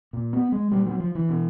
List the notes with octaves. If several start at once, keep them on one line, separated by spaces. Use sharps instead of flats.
A#2
B3
G#3
A#2 G3
F#3
F3
E3
B2